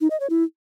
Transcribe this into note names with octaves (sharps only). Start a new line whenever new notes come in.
D#4
D#5
C#5
E4